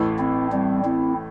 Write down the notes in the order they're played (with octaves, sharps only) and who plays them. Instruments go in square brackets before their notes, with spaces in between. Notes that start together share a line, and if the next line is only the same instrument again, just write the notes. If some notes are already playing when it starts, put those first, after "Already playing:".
Already playing: [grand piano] A1 A2 A3
[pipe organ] C4 E4
G3 C4
C4 E4